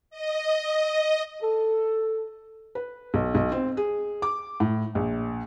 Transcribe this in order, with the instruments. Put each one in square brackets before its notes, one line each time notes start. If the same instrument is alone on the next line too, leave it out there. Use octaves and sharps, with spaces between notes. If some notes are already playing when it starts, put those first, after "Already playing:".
[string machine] D#5
[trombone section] A4
[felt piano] B4
B1
B1
C4
G#4
D6
A2
A#1